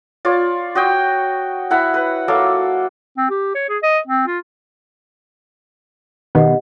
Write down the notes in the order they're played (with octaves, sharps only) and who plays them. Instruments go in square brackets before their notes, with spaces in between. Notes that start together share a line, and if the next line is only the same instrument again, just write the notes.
[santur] F4 C#5 D5
F#4 D#5 G5
E4 F#5 B5
B4
F#3 A#3 A4
[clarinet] C4
G4
C#5
G#4
D#5
C4
F4
[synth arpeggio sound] B2 D#3 B3 [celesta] G4 D#5 F#5